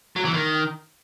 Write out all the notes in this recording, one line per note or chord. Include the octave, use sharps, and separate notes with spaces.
F#3
E3
D#3